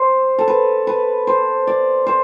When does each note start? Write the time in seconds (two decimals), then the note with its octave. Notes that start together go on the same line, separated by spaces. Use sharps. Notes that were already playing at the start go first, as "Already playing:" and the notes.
Already playing: C5
0.39 A4
0.48 B4
0.87 B4
1.27 C5
1.67 D5
2.06 C5